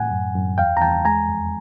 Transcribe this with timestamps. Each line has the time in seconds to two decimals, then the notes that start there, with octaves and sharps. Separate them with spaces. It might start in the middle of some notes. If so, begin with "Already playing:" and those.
Already playing: A2 F#5 G#5
0.11 F#2
0.35 F#2
0.58 E2 F5 G5
0.77 A#5
0.82 E2 G5 A5
1.05 G#3 G#5 A#5
1.29 F2